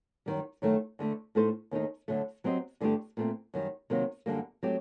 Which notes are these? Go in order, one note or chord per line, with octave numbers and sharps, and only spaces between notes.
F#2 D#3 G3
F#2 D#3 A3
D2 D3 A3
A2 A3 D#4 A4 C5
D#2 D#3 A3 D#4
D2 D3 F#3 A3
F#3 C4 G4 C5 D#5
G2 D3 A3 D4 G4
A#2 A3 C4
F#2 D#3 G3
C3 D#3 F#3 A#3
F#2 D3 G3 A#3
F#3 A3 C4 G4